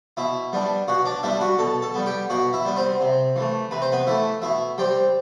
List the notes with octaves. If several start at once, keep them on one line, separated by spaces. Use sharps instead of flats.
B2 E4 E5
G3 B3 D4
B2 F#4 F#5
D4 D5
G3 B3 D4 E4 E5
F#4 F#5
B2 A4 A5
A4 A5
G3 B3
G4 G5
B2 F#4 F#5
E4 E5
G3 B3
C4 C5
C3
E3 A3
C3 B4
C5
B3 B4
E3 A3 E4 E5
B2 E4 E5
G3 C4 G4 G5